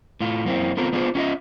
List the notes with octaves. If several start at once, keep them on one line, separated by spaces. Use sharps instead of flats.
A2 F4
F#2 A#3 C4 E4
B3 C4 F4 A4 A#4
B3 D4 F4 G#4 A4 C5
C#4 F4 G4 B4 D#5 E5